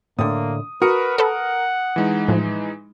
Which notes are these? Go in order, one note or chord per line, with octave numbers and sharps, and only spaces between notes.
A2 D3 A#3 D#6
F#4 A#4 B4 D#6 C#7
A4 B4 F#5
E3 G#3 D#4
A2 F3